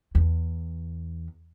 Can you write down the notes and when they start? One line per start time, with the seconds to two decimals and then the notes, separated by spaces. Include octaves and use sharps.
0.15 E2